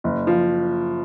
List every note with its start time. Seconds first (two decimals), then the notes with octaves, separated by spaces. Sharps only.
0.04 F#1
0.27 F3